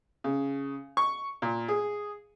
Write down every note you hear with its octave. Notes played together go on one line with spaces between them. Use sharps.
C#3
C#6
A#2
G#4